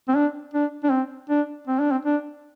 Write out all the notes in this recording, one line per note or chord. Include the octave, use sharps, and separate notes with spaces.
C4
D4
D4
D4
C4
D4
C4
D4
C4
D4